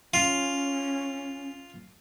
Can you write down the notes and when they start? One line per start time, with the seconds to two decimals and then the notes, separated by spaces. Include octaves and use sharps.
0.14 C#4 F4